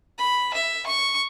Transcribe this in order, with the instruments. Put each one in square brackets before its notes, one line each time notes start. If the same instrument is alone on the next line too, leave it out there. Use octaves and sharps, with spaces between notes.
[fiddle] B5
E5
C#6